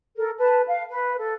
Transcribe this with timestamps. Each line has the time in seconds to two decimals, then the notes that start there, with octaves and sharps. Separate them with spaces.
0.16 A4 A#4
0.38 B4 A5
0.68 F5
0.89 B4
1.18 A4